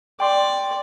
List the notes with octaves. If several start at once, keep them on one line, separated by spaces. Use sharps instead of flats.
D5 G5 C6 C#6